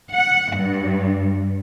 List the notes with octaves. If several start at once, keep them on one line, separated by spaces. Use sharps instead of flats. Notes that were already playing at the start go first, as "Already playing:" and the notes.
F#5
G2